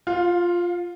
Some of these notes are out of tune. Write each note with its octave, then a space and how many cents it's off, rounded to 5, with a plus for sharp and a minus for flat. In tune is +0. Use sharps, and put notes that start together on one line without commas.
F4 +0 F5 +30